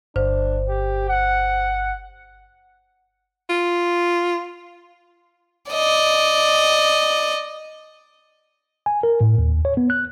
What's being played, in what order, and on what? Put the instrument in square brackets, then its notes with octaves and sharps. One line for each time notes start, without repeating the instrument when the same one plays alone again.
[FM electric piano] G1 [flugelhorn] D4 [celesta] C5
[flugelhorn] G4
F#5
[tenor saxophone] F4
[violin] D5 D#5
[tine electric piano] G#5
A#4
A2
D#2
C#5
B3
F#6